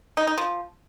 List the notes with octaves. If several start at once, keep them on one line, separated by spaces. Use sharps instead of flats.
D#4
D#4
F3